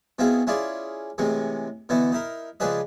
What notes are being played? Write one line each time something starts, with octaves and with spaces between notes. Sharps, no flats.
B2 C4 E4 F4 G#4
C#4 E4 F4 G#4 D5
A2 C3 E3 G#3
B2 D3 E3 B3 E4
D#4 E4 A#4
C#2 F3 D4 G#4 B4 D#5